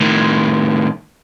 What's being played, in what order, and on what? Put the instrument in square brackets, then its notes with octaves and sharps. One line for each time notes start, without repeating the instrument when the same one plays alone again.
[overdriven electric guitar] A2 D#3